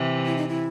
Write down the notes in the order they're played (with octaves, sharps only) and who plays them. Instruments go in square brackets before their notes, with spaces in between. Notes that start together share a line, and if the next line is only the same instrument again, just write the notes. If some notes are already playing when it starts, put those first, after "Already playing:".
Already playing: [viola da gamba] C3 E3
[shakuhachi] E4
D#4
E4